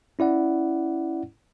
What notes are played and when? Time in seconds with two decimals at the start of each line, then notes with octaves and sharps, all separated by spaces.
0.19 C#4 E4 D5 F#5